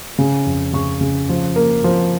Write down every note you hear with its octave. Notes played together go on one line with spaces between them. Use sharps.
C#3
F2
C#3 C#6
C#3
F3
A#3
F3